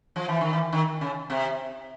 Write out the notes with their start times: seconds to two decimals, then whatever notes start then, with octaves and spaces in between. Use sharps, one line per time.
0.16 F3
0.28 E3
0.41 D#3
0.53 E3
0.73 D#3
1.01 C#3
1.30 C3